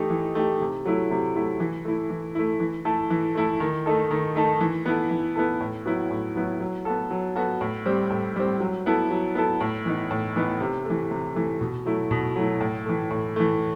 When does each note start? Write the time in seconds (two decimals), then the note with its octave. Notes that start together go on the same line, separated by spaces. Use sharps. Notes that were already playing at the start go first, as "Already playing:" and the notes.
Already playing: E3 A3 D#4 G4
0.10 E3
0.35 A3 D#4 G4
0.60 C3
0.85 F#3 A3 E4
1.11 C3
1.36 F#3 A3 E4
1.60 E3
1.85 A3 E4
2.10 E3
2.35 A3 E4
2.60 E3
2.85 A3 E4 A4
3.10 E3
3.35 A3 E4 A4
3.60 D#3
3.86 A3 D#4 A4
4.11 D#3
4.36 A3 D#4 A4
4.60 E3
4.86 B3 E4 A4
5.10 E3
5.36 B3 E4 A4
5.60 A2
5.85 F#3 B3 E4
6.11 A2
6.35 F#3 B3 E4
6.60 F#3
6.85 B3 F#4 A4
7.11 F#3
7.36 B3 F#4 A4
7.61 A2
7.86 G3 C4
8.10 A2
8.36 G3 C4
8.60 F#3
8.86 B3 E4 A4
9.11 F#3
9.35 B3 E4 A4
9.60 A2
9.85 E3 B3 D#4
10.11 A2
10.36 E3 B3 D#4
10.60 C3
10.85 E3 A3
11.11 C3
11.35 E3 A3
11.61 B2
11.85 F#3 A3 E4
12.11 B2
12.36 F#3 A3 E4
12.61 A2
12.86 E3 A3
13.10 A2
13.36 E3 A3